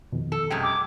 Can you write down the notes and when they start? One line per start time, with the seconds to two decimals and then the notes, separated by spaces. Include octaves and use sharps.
0.12 F2 B2 D#3
0.32 A4
0.50 F#2 C3 G#3 G5 D#6
0.63 D6